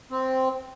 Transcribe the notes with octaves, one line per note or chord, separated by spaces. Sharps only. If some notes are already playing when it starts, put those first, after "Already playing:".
C4